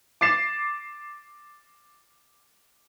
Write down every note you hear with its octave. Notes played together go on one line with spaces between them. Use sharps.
D6 A6 C7 E7